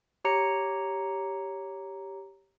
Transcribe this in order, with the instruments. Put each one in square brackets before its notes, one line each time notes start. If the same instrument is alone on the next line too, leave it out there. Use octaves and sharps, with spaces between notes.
[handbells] G4 C#5 A#5 C#7